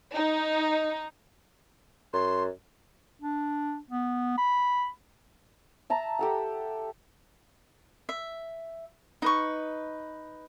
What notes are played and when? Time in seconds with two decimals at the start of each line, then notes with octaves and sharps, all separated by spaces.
0.13 D#4
2.13 F#2 C6
3.22 D4
3.91 B3
4.38 B5
5.90 E5 A5 A#5
6.19 G4 A4 F#5
8.09 E5
9.22 D#4 B4 C#6